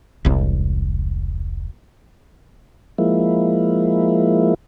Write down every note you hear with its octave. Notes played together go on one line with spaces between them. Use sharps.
E1 C2
F3 G#3 A#3 E4